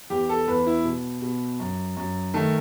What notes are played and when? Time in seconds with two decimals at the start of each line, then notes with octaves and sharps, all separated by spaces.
0.10 E2 G4
0.29 A4
0.48 E2 B4
0.66 E4
0.84 B2
1.22 B2
1.60 F#2
1.97 F#2
2.34 D#3 A3